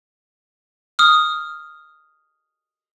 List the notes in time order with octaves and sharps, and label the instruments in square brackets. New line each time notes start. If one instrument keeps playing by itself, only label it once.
[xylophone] D#6 F6